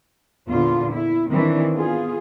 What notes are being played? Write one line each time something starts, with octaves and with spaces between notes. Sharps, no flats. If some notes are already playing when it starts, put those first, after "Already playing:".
E2 A#2 D3 F4
E4
D#3 E3 C4 D4
B3 F4 G#4